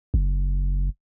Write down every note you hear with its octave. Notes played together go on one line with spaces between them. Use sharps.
F#1